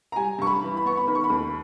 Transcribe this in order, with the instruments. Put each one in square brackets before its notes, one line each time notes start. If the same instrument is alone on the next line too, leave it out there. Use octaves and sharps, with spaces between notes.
[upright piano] A#5
G3 G#5
G2 C#6
B5
E3
B5
B3 C#6
B5
D#3 B5
C#6
B5
D#2